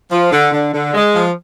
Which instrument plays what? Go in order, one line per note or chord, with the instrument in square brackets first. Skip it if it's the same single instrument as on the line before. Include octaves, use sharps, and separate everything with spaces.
[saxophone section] F3
D3
D3
D3
G#3
F3